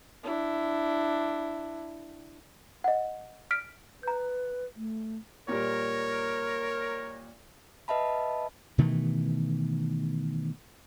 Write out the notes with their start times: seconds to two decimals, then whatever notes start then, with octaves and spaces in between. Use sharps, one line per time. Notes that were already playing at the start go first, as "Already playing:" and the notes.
0.24 D4 E4
2.84 D#5 F#5
3.51 F6 B6 D7
4.03 B4 A#5 G6
4.76 A3
5.48 A#2 G3 A#4 C#5
7.88 B4 D#5 E5 A5 B5
8.78 B2 D#3 E3 A3